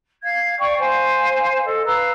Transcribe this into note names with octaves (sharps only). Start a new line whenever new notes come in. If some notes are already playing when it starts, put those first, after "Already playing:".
F5 G#6
D5 F5 G5 C#6
C5 F5 G#5
A4 D#5
B4 F5 A#5 E6